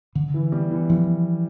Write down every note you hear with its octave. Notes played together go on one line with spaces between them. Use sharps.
D3
E3
G3 B3
E3
E3 F3